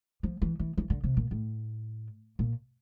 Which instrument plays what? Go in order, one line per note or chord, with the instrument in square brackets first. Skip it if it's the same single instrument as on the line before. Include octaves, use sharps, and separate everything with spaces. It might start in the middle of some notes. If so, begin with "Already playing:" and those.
[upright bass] F3
E3
E3
E3
D3
C3
A#2
A2
A#2